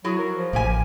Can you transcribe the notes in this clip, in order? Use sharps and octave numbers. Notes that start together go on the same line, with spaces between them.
F#3 E4 F#4 G#4
A#4
F3
A1 A#3 G4 G#5